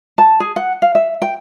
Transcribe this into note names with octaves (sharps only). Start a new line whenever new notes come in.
A5
G#4
F#5
F5
E5
G5